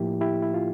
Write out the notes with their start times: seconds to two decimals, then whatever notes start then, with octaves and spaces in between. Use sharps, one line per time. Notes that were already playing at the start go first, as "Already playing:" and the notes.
Already playing: A2 F3 A#3 E4 G4
0.21 E4 G4
0.43 E4
0.54 F4